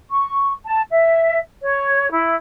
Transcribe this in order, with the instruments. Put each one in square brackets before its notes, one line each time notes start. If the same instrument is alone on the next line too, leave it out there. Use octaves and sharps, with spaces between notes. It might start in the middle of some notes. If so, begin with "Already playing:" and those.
[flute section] C#6
A5
E5
C#5
E4